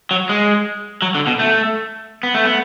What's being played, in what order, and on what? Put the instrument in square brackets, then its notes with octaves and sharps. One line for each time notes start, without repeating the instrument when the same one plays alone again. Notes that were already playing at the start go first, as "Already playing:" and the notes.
[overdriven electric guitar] F#3
G#3
F#3
D3
B2
A3
B3
A3
B3